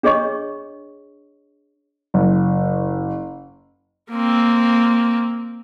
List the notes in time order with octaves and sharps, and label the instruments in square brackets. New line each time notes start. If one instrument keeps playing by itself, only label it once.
[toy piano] D4 G#4 C#5 D#5 C#6
[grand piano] F#1
[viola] A#3 C4